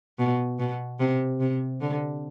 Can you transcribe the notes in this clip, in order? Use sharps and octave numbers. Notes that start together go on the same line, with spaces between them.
B2
B2
C3
C3
D3